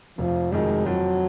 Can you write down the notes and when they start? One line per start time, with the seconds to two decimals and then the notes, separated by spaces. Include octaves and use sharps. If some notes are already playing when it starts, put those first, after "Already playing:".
0.18 F1 F3
0.52 F2 D#3 F#3 G#3
0.86 F2 F#3